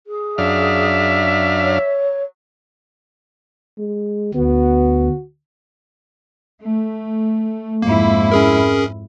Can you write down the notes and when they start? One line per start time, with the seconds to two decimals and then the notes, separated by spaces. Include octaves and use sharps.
0.07 G#4
0.38 F#2 D4 E5 F5
1.63 C#5
3.78 G#3
4.35 D2 B3 F#4
6.64 A3
7.82 F2 G#2 A#3 E4
8.32 C#4 G#4 A#4